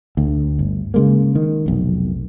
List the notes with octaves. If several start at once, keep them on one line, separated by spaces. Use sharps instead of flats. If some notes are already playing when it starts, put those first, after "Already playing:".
D2
G1
C#3 G#3 A#3
D#3
F1 B1